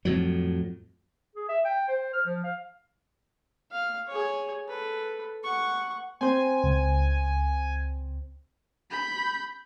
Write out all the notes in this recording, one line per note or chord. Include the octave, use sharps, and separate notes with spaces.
F2 A2 F#3
G#4
E5
G5
C5
F6
F3
F5
F5
G#4 C#5
A4 B4
F#5 C#6
C4 C5 G#5
C#2
B5 G6